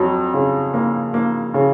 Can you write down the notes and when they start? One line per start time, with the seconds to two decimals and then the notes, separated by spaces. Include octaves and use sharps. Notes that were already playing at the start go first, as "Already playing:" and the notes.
Already playing: F2 F#3
0.34 C#3
0.74 A#3
1.14 A#3
1.54 C#3